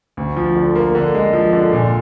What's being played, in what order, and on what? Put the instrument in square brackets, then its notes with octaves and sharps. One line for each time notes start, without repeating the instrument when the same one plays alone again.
[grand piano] D2
F3
D3
A#3
D3
G#3
F3
D3
A#2